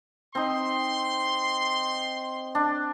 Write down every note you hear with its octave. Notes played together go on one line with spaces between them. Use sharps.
C4 D#4 C6
D4